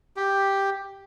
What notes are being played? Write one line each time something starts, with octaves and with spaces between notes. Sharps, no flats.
G4